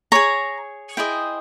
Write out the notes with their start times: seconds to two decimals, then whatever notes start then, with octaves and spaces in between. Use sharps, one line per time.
0.12 G#4 C#5 A#5
0.97 E4 G#4 C5 D#5 G5